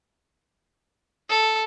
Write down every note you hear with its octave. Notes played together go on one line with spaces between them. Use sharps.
A4